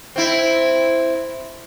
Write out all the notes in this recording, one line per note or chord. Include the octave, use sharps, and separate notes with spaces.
C4 E4